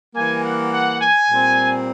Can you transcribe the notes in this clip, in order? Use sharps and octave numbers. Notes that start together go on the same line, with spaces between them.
E3 G3 A#3 G#5
F#5
F#5
G#5
A#2 G3 C4